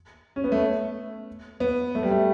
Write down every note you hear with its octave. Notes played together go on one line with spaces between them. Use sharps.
C#4
B3
A3
B3
A3
G3
A3